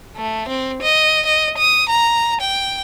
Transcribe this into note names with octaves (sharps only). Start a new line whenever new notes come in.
A3
C4
D#5
D#5
D#6
A#5
G5